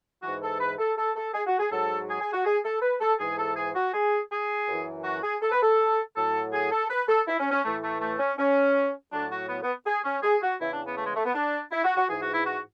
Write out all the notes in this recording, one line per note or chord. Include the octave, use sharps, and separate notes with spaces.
G#2 E3 F#4
A4
B4
A4
A4
A4
G#4
F#4
G#4
G#2 F#3 A4
G#4
G#4
F#4
G#4
A4
B4
A4
G#2 E3 G#4
A4
G#4
F#4
G#4
G#4
F#2 E3
F#4
G#4
A4
B4
A4
A2 F#3 A4
G#4
A4
B4
A4
E4
C#4
C#4
A2 E3 A3
A3
A3
C#4
C#4
A2 F#3 D4
F#4
B3
B3
G#4
C#4
G#4
F#4
E2 C#3 E3 E4
D4
B3
A3
G#3
A3
B3
D4
E4
F#4
F#4
G#2 E3 G#4
F#4
E4
F#4